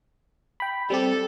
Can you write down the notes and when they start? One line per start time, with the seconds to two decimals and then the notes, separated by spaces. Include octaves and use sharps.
0.60 G5 B5
0.90 G3 C4 G4 A4